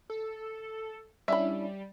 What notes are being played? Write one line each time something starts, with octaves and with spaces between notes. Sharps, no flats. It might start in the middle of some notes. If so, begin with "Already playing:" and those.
A4
G3 C#4 D4 E4 E5 B5